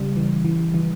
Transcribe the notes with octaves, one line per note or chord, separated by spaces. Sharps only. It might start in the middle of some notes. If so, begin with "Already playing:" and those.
Already playing: C#3 G3
E3
E3
E3